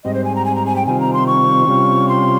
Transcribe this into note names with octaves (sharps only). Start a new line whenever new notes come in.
G#2 G3 C4 D#5
C5
G#5
A#5
G#5
A#5
G#5
G5
C3 D#3 G3 C4 F4 G#5
A#5
C6
C#6
C3 G3 C#4 F4
C6